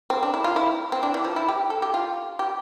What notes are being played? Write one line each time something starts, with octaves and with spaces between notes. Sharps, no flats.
C4
D4
E4
F4
E4
C4
D4
E3
F3
E4
G4
A4
G4
F4
G4